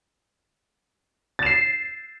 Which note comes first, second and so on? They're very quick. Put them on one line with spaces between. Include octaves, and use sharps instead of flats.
A6 E7 C7